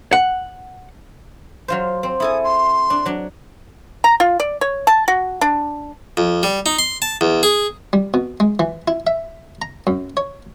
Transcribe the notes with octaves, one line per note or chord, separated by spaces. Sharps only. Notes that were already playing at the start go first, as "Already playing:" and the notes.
F#5
F#3 F4 C5
C4
E4 A4 G#5 D#6
C6
D4
F#3 D4
A#5
F4
D5
C#5
A5
F#4
D4
F2
G3
D#4
C6
A5
E2
G#4
G3
B2
G#3
E3
E4
E5
A#5
F#2
C#5